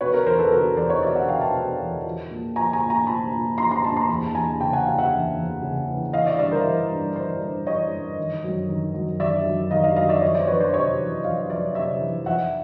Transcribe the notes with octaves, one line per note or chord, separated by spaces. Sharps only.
B2 B4 C#5
A#4
E2 A#4 C5
A4 B4
B2 A#4
A4
E2 C5 D5
C#5 D#5
B2 D5 E5
E5 F#5
E2 F5 G5
G5 A5
B2
E2
F3
A#2
F3 G#5 A#5
G#5 A#5
A#2
G#5 A#5
F3 A5 B5
A#2
F3 A#5 C6
A#5 C6
A#2 A5 B5
A#5 C6
E2 A5 B5
A5
E2 G#5 A#5
C#3 G5 A5
F#5 G#5
E3 F5 G5
E5 F#5
E2
E2
C#3
E3
E3 D#5 F5
D5 E5
G2 D5 E5
A#4 C5
E3
G2
E3 C5 D5
G2
E3 C#5 D#5
G2
D#3
F#2
D#3
F#2
D#3 D5 E5
F#2
D#3 D#5 F5
D#5 F5
F#2 D#5 F5
D5 E5
F2 C#5 D#5
C5 D5
F2 B4 C#5
C5 D5
C3 C#5 D#5
E3
F2 D#5 F5
F2 D5 E5
C3 D5 E5
E3
F2 E5 F#5